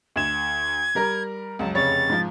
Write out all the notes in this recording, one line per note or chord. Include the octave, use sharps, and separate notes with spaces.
D2 G#6 E7
G3 A#4 A#5
C#2 F#2 A5
F1 C#3 C#5 A6
G#2 F3